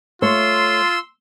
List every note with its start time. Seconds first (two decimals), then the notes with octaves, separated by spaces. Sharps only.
0.22 A3 F4 C#5 C6 E6